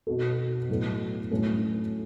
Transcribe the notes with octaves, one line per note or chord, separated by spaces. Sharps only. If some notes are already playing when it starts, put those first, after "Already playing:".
B2 B3 F#4 A4
A2 F#3 B3 F#4 A4
A2 F#3 A3 C#4 A4